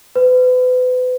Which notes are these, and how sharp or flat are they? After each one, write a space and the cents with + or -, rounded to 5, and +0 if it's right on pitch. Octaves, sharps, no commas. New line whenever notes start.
B4 +35